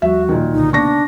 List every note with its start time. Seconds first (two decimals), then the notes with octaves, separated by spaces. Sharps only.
0.02 D#2 F3 G3 F#4 E5
0.29 A#2 D#3
0.53 C2 B2 D3 D#4
0.73 C#3 A#3 B3 D4 C#6 A#6